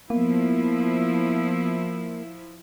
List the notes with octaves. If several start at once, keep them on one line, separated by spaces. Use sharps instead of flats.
F3 A#3 B3 E4